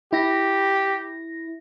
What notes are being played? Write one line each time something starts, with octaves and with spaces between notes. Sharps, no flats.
E4 G4 A#6